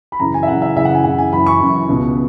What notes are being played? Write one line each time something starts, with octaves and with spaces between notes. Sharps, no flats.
B5
F#2 C#3 E3 A#5
G#5
E5
F#2 C#3 E3 F#5
E5
F#2 C#3 E3 E5
F#5
G#5
F#2 C#3 E3 F#5
G#5
F#2 E3 B5
C#6
F#2 E3
C#2 B2